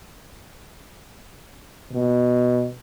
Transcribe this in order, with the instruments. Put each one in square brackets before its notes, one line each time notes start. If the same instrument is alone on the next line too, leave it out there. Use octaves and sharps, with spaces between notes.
[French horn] B2